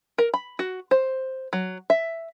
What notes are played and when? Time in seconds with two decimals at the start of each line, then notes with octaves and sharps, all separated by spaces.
0.18 A#4
0.34 B5
0.59 F#4
0.91 C5
1.53 F#3
1.90 E5